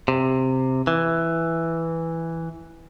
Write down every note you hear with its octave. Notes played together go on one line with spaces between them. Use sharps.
C3
E3